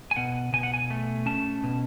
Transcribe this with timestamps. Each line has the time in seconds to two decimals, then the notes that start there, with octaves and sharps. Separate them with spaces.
0.11 G#5
0.16 B2 F#5
0.53 B2 G#5
0.63 F#5
0.74 G#5
0.90 A3
1.26 C#4 A5
1.63 B2